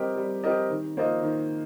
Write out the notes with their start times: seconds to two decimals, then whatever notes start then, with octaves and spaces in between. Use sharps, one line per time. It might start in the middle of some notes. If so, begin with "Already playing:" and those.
Already playing: G3 C4 G4 A#4 D#5
0.17 G3
0.44 C4 G4 A#4 D#5
0.70 D#3
0.97 A#3 F4 C5 D#5
1.23 D#3